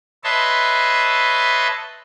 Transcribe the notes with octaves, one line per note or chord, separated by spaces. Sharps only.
B4 C#5 D#5 E5 A5 C6